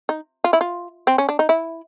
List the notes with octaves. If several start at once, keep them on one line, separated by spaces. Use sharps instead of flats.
D#4
F4
E4
F4
C4
C#4
D4
D#4
E4